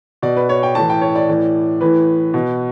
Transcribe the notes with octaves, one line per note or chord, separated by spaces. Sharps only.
B2 D5
B4
C#5
G5
A2 E3 A5
G5
C#5
D5
A2 E3
A2 E3 B4
B2